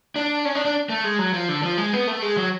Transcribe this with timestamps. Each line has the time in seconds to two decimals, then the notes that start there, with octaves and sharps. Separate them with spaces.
0.16 D4
0.45 C#4
0.55 D4
0.65 D4
0.90 A3
1.04 G#3
1.19 F#3
1.33 F3
1.49 D3
1.63 F3
1.78 G#3
1.93 B3
2.07 A3
2.22 G#3
2.37 F#3